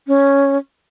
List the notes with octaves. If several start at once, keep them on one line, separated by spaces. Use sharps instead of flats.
C#4